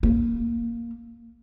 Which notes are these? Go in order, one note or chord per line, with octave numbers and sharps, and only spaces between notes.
A#3